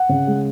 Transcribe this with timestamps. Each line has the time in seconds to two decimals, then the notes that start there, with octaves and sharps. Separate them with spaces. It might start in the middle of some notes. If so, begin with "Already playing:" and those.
Already playing: F#5
0.09 C#3
0.27 G#3